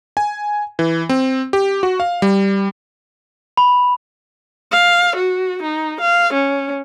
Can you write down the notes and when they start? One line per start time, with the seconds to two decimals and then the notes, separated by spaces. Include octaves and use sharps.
0.17 G#5
0.79 E3
1.09 C4
1.53 G4
1.83 F#4
2.00 F5
2.22 G3
3.57 B5
4.72 F5
5.16 F#4
5.63 D#4
6.01 F5
6.34 C#4